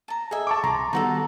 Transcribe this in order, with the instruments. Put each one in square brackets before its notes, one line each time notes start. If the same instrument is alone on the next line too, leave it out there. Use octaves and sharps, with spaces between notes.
[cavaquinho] A5 A#5
[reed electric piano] G#4 A4 D#5 [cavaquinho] E5 G#5
[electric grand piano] A5 C#6 D6
[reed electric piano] C2 C6 [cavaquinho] A5 [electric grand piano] A#5
[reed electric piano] D#3 G3 B3 [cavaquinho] D#4 F#4 A4